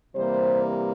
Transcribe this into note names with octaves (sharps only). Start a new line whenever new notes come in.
C3 E3 G3 A#3 C5